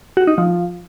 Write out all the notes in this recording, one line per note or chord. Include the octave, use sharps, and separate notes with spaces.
F#4
D#4
F3